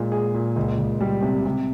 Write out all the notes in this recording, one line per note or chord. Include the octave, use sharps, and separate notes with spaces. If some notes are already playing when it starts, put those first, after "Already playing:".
Already playing: A#2 G#3
G#4
A#2
C#2
C#2
G3
C3
C3